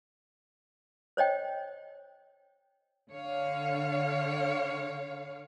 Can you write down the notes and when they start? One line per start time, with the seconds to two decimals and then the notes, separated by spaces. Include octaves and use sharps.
1.17 C5 C#5 D#5 G5
3.10 D3 C#5 F5